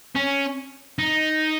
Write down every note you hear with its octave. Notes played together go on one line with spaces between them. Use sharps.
C#4
D#4